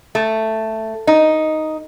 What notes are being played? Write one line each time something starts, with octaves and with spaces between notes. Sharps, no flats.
A3
D#4